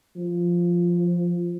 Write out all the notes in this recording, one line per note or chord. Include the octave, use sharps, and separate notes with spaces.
F3